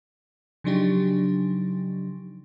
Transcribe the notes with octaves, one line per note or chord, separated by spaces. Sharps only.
C#3 F3 F#3 D4 D#4 G4